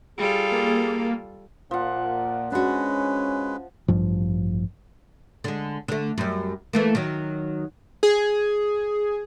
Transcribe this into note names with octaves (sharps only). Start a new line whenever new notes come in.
G3 F4 G#4 A4
A#3
A#2 F3 F#5
G#3 C#4 D4 F#4 B4
A1 G2 F3
D3 G#3
D3 A3
F#2 G3
E3 A3 A#3
D#3 F#3
G#4